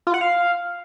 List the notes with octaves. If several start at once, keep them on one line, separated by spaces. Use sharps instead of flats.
F4
F#5
F5